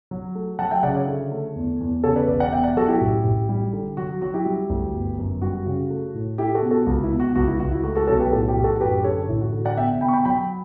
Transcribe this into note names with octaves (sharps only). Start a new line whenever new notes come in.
F#3
A3
F#3 F#5 A5
E5 G5
C#3 D5 F#5
C#5 E5
D3
A3
E2
E2
C#3 A4 C#5
B4 D5
E1 B4 D5
D5 F#5
B2 E5 G5
D5 F#5
F#3 F#4 A4
E4 G4
A1
A1
G3
D3
F#3 F#4
F#3 F#4
E4 G4
G3
D2
G1
F#2
G3 F#4
C#3
A3
A2
A3 E4 G4
F#4 A4
B2
F#4 A4
C#2
E4
B2
F#4
C#2 F#4
E4
C#2 F#4
E4
A3 F#4
F#4 A4
B1 A4 C#5
G4 B4
A2 F#4 A4
E4 G4
A1
F#4 A4
F#2 G4 B4
D3 A4 C#5
A1 E4
F#4
D3
D5 F#5
B2 E5 G5
B2 G5 B5
C#6
G5 B5
F#3 G5 B5